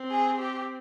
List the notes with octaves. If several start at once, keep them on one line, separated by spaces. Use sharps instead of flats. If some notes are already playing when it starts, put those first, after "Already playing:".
Already playing: C4
G#4
G4